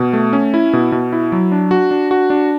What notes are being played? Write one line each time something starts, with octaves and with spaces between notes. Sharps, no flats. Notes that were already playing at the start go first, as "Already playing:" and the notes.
Already playing: B2
A3
C#4
E4
B2
B2
E4
F#3
D4
F#4
D4
F#4
D4